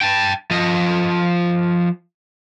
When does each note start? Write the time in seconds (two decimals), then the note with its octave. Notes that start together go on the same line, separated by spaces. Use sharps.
0.01 G5 A5
0.51 F3 D#5